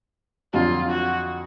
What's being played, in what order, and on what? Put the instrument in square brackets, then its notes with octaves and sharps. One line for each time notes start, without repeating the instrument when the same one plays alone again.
[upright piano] F2 D3 F#3 [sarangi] F4
[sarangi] F#4